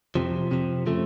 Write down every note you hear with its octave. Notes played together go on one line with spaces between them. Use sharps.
F2 C3 F3
F2 C3 F3
C#3 F3 A3